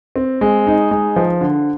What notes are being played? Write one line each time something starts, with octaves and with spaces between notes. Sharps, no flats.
C4
G#3
D#4
G#3
F3
D3